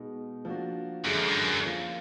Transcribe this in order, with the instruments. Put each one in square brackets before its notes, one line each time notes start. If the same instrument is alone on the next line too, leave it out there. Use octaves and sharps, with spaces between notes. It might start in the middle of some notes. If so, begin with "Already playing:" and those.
Already playing: [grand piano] B2 G#3 D#4
F3 A#3 D4 F#4
[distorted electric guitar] F#2 [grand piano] D3 G#3 D4
[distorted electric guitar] F2
F#2
[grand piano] F3 A#3 F4